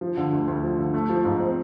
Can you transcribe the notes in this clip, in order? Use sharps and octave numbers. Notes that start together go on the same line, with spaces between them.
F3
D3
D2
D2
F3
D3
A3
F3
G#2
C4